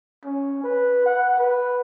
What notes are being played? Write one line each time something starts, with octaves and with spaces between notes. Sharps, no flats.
C#4
B4
F#5
B4